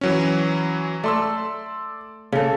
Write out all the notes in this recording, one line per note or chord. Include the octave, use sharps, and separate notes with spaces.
E3 F#3 C#4
A3 D5 C6 E6
C#3 A4